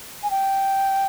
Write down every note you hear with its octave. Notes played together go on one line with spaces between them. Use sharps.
G#5
G5